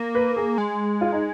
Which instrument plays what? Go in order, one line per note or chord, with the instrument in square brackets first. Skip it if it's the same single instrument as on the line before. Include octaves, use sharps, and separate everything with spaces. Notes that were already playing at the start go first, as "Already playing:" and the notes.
Already playing: [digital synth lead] A#3
[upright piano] B4
G#4
[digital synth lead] G#3
[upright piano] F4
D#4